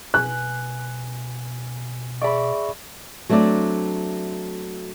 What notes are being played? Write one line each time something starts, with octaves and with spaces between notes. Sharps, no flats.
B2 B4 G#5 F#6
G#4 D5 E5 B5 C#6
F#3 A3 C4 D4 D5